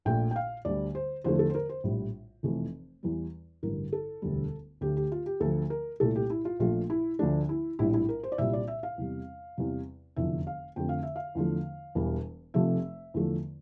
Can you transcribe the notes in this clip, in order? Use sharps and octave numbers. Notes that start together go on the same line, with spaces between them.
A#1 A#2 A3 G5
G5
F5
D2 D3 G3 D5
C5
E2 D3 F3 A3 C5
A4
C5
A#4
C5
A#1 A2 G3
F1 F2 E3 A3
E2 E3 G3
A1 G2 D3 A#4
A4
E1 D2 D3 G3
D2 D3 A3 G4
G4
F4
G4
D2 D3 F3 A4
A#4
C2 A#2 A3 A4
G4
E4
F4
A#1 A#2 F3 A3 F4
E4
D2 D3 F3 A3 D4
E4
A#1 A2 G3 E4
E4
A#4
C5
D5
C2 A#2 G3 E5
D5
E5
F5
E2 C3 G3
E2 C3 G3
F1 E2 D3 F3 E5
F5
F2 D3 F3 A3 G5
F5
E5
F5
E2 D3 F3 A3
E1 E2 E3 G3
F1 F2 C3 F3 A3 E5
E2 D3 F3 A3